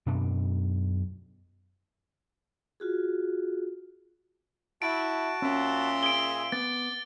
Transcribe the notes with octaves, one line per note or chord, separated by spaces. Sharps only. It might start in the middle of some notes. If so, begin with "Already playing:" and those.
F#2 B2 D4
F4 F#4 G#4
E4 F#4 A5 D7
A#2 C#4 E5 C6
G#4 G#5 D7 G7
B3 D6 A6